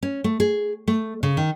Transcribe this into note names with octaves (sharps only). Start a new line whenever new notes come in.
C#4
A3
G#4
A3
C#3
D#3